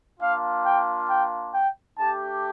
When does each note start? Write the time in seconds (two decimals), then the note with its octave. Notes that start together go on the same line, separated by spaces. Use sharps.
0.20 A#3 D4 F4 F5
0.64 G5
1.08 G5
1.53 G5
1.97 A3 D4 G4 A5